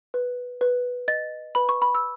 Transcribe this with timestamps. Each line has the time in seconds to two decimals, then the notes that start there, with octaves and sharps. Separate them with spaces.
0.14 B4
0.61 B4
1.08 D#5 A6
1.55 B4 B5
1.69 C#6
1.82 B5
1.95 E6